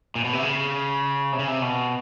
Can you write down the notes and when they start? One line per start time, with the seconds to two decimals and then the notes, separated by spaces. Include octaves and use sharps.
0.15 A#2
0.24 B2
0.33 C3
0.43 C#3
1.33 C3
1.39 C#3
1.47 C3
1.62 B2